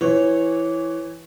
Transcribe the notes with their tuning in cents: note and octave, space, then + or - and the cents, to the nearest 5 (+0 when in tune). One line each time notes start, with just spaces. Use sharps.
E3 +0 C#5 -15